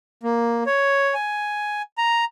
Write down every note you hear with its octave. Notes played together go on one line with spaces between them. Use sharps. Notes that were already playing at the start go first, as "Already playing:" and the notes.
A#3
C#5
G#5
A#5